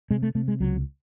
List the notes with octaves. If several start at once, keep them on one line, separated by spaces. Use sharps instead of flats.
C3 G#3
A3
C3 A3
G#3
C#2 F#3